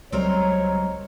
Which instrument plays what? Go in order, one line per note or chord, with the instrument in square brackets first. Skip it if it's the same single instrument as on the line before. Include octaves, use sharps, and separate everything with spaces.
[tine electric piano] C#2 F#3 G3 [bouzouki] C4 D#4 A#4 [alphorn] C#5